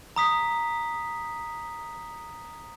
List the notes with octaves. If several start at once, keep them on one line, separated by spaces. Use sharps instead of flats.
A#5 D#6 B6